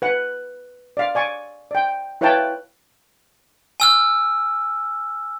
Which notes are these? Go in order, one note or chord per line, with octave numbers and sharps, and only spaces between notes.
B4 F#5
D5 F5
D5 G#5 C#6
D5 G5
E4 B4 C#5 F5 G5 A5
G#5 E6 F6